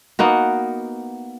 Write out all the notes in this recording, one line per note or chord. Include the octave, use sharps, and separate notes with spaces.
A#3 B3 D#4 F#4